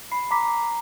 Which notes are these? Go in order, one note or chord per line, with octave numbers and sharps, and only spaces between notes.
B5 C7
A#5 B5 D6 B6